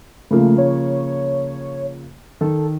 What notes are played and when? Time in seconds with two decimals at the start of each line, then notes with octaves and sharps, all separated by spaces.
0.31 C#3 F3 A3 A#3
0.58 C#5
2.41 D#3 A4